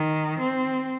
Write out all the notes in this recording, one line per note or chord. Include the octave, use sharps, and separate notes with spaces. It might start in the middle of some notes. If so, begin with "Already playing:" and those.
Already playing: D#3
C4